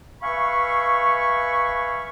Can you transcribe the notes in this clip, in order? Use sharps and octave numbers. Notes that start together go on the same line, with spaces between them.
B4 E5 F5 G#5 B5 C#6